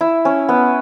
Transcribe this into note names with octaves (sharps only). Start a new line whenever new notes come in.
E4
C#4
B3